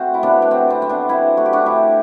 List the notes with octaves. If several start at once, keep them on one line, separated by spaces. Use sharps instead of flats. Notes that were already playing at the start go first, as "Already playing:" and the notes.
Already playing: A3 C4 F#4
E4
C3 B3 D4
D4
C3 C4
C4
F#3 C4
B3 D4
C3 C4 E4
A3 F#4
G4
D4 F#4
C3 E4 G4